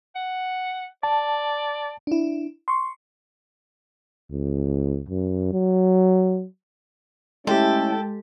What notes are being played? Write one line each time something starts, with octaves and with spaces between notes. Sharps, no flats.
F#5
D5 A5
D4 E4
C6 C#6
C#2
F#2
F#3
G#3 A3 C#4 E4 G4 A4 G5 A5